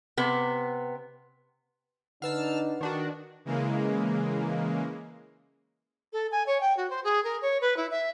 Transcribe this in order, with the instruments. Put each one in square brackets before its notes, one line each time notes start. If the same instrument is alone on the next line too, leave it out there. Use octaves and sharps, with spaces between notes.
[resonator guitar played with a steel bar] C3 B3
[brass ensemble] D3 D4 D#4 [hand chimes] B4 F#5 [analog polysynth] A5 E6 F6
[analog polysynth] D#3 D4 F#4
[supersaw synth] C#3 E3 G#3 A#3
[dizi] A4
G#5
C#5
G5
F#4
C5
G#4
A#4
C#5
B4
E4
E5